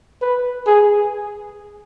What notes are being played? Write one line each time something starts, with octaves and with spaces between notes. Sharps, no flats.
B4
G#4